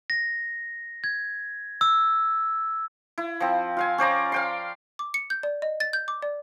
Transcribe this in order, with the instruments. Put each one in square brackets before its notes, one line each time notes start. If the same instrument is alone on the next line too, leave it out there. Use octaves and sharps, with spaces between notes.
[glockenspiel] A#6
G#6
E6
[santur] E4
F3 C4
F4 F5 G#5
C#4 C5 D5 A#5
F5 G5 C6
[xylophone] D6
C#7
G6
D5
D#5
A6
G6
D6
D5